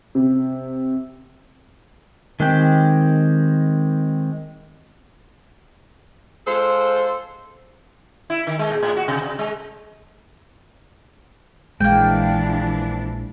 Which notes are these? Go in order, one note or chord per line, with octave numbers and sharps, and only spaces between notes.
C3
D#3 G#3 C4 G4 G5
G#3 F4 A4 C5
E4
D#3
G#3
A#2
A2
F#4
C3
C3
G#3
A#1 E3 F3 G#3 A#3 D4 G5